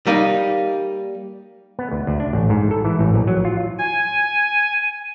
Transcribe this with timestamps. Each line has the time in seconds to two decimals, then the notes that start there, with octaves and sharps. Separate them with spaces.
0.07 G3 A#3 D#4
1.79 B3
1.91 D2
2.07 D2
2.20 D4
2.33 A1
2.50 G#2
2.71 A4
2.85 E3
2.99 A1
3.14 A#1
3.28 F#3
3.45 F4
3.78 G#5